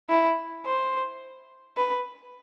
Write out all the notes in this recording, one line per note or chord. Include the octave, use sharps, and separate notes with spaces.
E4
C5
B4